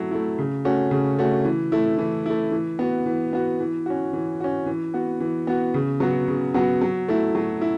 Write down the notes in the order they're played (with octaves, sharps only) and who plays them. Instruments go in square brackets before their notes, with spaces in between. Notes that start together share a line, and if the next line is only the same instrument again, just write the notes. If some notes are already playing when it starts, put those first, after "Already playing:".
Already playing: [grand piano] F#3 A3 E4
A3 E4
C#3
A3 C#4 F#4
C#3
A3 C#4 F#4
E3
A3 E4
E3
A3 E4
E3
B3 F#4
E3
B3 F#4
E3
C#4 F#4
E3
C#4 F#4
E3
B3 F#4
E3
B3 F#4
C#3
F#3 B3 F#4
C#3
F#3 B3 F#4
F#3
A3 E4
F#3
E4